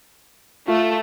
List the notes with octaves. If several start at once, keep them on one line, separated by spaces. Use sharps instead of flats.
A3 F4